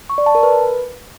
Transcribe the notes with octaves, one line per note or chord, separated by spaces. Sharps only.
C#6
D5
A5
A#4
B4